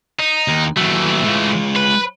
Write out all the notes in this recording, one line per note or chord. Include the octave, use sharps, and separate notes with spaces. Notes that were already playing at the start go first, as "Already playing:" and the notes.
D#4
D#2
D#2 E3 F#3 A3
G#3 F4
B4